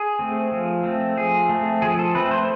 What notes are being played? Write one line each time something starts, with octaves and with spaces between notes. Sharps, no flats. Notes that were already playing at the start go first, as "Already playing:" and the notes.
Already playing: G#4
A3 C4
F3
A3 C4
F3 G#4
A3 C4
F3 G#4
A4
A3 C4 B4
C5